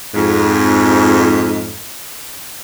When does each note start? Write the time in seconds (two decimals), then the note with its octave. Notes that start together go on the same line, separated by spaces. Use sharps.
0.15 F2 G#2